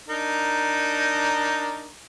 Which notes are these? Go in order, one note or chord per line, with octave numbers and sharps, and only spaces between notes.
D4 D#4 A#4